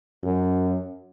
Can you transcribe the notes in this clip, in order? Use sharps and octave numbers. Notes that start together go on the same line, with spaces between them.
F#2